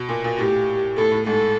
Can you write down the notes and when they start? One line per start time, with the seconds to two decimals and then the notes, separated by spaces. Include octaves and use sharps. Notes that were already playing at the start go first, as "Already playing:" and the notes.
Already playing: B2
0.09 A#2
0.24 A#2
0.38 A2 G4
0.97 A2 A4
1.12 A2
1.26 G#2 A4